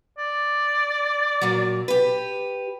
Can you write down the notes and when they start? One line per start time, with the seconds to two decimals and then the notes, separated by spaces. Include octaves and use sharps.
0.18 D5
1.41 A#2 F#3
1.88 G4 B4